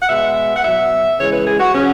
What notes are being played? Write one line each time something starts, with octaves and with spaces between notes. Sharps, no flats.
F#5
B2 G#3 E5
F#5
B2 F#3 E5
C#3 E3 G#3 C#5
B4
G#4
F#4
C#3 F#3 C#4